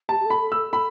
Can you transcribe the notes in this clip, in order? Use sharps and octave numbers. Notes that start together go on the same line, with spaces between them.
G4 A5
G4
A4
B5
A4
E6
A4
A4 B5